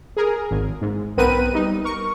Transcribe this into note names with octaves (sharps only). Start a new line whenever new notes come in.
G#4 A#4
G#1
G#2
B1 B3 C4 A#4 B4 D#7
G3 D#4
A#4 C#6